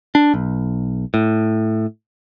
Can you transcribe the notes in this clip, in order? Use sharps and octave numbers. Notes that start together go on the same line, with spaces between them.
D4
B1
A2